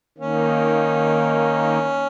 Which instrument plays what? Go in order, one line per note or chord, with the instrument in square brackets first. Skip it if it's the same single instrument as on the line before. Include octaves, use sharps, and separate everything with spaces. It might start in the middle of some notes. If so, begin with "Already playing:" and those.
[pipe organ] D#3 A#3 D#4 [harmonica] C#4